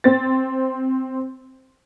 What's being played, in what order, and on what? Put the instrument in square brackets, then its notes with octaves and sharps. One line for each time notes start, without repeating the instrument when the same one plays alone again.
[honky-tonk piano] C4 C5 A6